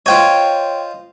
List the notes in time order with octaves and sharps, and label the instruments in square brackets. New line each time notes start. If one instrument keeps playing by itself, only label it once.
[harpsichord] F4 C5 D#5 [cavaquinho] C#5 G5